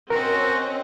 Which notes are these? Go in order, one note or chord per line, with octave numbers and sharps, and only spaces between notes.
C4 C#4 F#4 A#4 D#5